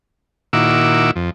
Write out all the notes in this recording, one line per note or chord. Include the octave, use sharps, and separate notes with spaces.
A#2 D#3 E4 F#4 D6 E6
F2